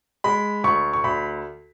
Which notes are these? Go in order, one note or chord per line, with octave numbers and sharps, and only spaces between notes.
G#3 B5
D2 C#6
C#6
D2 B5